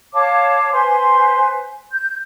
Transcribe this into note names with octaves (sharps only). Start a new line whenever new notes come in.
C#5 F5 A5 D6
B4 C5 G#5 C6
G6